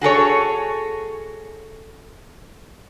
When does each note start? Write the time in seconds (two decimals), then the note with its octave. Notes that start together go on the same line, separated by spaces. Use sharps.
0.01 F#4 G#4 A4 C#5